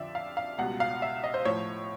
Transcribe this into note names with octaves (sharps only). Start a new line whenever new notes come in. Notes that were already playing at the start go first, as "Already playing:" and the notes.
Already playing: F2 D3 F3 D5 E5
F5
F5
C#2 B2 G3 F#5
F5
E5
D#5
C5
A2 F3 C#5